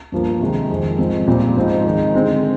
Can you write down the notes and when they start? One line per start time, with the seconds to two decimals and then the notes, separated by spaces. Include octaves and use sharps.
0.12 G2 F3 A#3
0.41 C3 D#3 G#3 D#4
0.70 F2 D#3 G#3
0.98 G#2 F3 C4 D#4
1.27 A#2 G3 C4
1.56 G#2 F3 C4 D#4
1.84 D#3 G#3 D#4
2.14 D3 G#3 C4